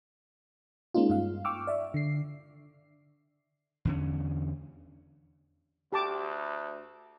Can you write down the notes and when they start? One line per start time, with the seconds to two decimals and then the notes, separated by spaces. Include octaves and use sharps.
0.94 G#3 A#3 C#4 D#4 F4
1.10 G2 F5
1.45 G5 C#6 D6 E6 F6
1.67 D5 E5
1.94 D3 C7
3.85 E2 D3 C#4
5.93 D2 G4 A5 D6